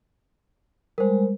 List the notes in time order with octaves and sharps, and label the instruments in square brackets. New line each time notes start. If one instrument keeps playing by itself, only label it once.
[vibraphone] G3 G#3 [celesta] A#4 C5